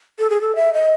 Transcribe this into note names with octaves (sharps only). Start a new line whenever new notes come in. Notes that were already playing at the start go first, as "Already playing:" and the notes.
A4
G#4
A4
E5
D#5